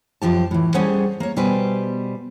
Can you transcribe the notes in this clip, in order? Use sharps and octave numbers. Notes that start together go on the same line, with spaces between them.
F#2 F3 G4 A5
A2 E3
G3 C#4 G#4 A4 C5 F#5
A#3 C#5
B2 G3 G4 B4 C5 G#5